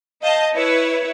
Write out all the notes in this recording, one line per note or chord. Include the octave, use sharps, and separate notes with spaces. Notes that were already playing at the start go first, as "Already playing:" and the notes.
D#5 F5 A5 G6
E4 B4 C#5